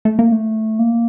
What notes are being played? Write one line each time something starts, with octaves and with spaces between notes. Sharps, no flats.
A3
A#3
A3
A#3